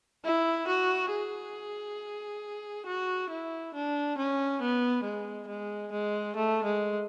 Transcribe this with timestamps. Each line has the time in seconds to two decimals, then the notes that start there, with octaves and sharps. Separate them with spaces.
0.25 E4
0.67 F#4
1.11 G#4
2.86 F#4
3.30 E4
3.74 D4
4.18 C#4
4.61 B3
5.04 G#3
5.48 G#3
5.92 G#3
6.36 A3
6.64 G#3